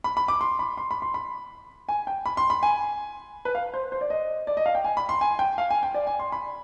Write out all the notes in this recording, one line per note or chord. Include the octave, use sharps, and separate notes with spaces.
B5
B5
D6
C6
B5
C6
B5
C6
B5
G#5
G5
B5
C6
B5
G#5
B4
F5
C5
C5
D5
D#5
D5
D#5
F5
G5
G#5
B5
C6
G#5
G5
F5
G#5
G5
D5
G#5
C6
B5